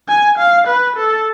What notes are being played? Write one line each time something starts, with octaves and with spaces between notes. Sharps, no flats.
G#5
F5
B4
A4